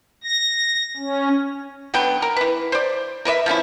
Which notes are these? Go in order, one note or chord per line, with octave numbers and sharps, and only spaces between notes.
A#6
C#4
D3 F#3 B3 G5
A#4
E3 B4
C5 D5
A#4 B4 C#5 E5
F3 B3 C#4 E4